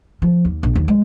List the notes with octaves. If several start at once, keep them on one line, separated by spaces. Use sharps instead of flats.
F3
D#2
A#1
D#2
G#3